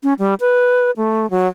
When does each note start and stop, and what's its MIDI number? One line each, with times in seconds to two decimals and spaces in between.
0.03 0.13 61
0.19 0.34 55
0.40 0.91 71
0.97 1.29 57
1.31 1.47 54